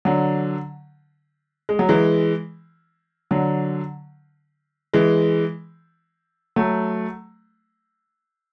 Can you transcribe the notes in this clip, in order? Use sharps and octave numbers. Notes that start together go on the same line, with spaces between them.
D3 F#3
G#3
F#3
E3 G#3
D3 F#3
E3 G#3
F#3 A3